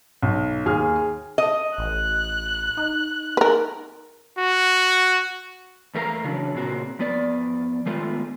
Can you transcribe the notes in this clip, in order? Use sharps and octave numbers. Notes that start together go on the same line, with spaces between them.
B1
D#2 G#4 F6
D#5
A1 F#6
D#4
A#4 B4
F#4
E2 A3 A#4 F5 A#5
C#3 E3 F#3 D4
A#2 C#3 C4 F#4 A#4
F2 B3 D5
D#3 G#3 A3 B3 F4